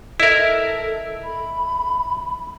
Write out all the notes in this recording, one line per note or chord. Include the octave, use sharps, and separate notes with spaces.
E4 A4 A#4 D#5 E5
B5